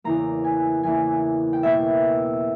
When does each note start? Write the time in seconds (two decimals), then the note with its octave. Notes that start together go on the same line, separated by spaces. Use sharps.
0.04 E2 C#3 E3 A#3 A#5
0.44 G#5
0.83 E2 C#3 E3 A#3 G#5
1.53 G5
1.63 B2 A#3 E5